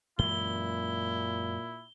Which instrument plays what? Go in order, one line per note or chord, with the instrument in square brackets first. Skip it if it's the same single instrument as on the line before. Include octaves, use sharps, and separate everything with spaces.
[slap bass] F#2 E3 G#3 [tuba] A#2 [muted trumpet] E4 [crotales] G7